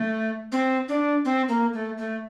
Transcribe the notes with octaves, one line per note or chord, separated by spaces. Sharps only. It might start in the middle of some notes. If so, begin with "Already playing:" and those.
Already playing: A3
C4
D4
C4
A#3
A3
A3